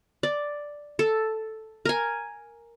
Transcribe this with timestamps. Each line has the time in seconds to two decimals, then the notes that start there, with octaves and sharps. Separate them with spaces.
0.23 D5
0.99 A4
1.85 A#4 G#5